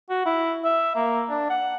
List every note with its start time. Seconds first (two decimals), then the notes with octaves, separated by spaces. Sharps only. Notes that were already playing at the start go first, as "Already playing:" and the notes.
0.10 F#4
0.26 E4
0.64 E5
0.95 A#3
1.29 D4
1.50 F#5